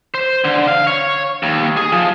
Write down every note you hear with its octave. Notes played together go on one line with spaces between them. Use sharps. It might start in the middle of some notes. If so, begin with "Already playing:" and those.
C5
D3
F5
C#5
D#2
G#4
F3